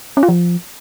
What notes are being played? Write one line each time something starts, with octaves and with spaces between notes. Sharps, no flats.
C#4
F4
F3